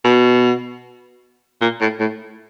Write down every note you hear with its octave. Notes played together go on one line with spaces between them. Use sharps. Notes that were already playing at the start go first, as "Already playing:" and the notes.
B2
A#2
A2
A2